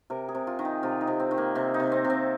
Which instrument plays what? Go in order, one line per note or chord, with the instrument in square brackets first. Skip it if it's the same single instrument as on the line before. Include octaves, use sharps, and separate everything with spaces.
[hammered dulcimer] C3 A#4
G#4
C3
F4
D#3
D#4
C3 F4
D#4
C3
C4
D#3
A#3
C3 C4
D#4
C3
C4
C3
C4